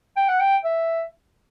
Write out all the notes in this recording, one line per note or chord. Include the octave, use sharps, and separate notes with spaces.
G5
F#5
G5
E5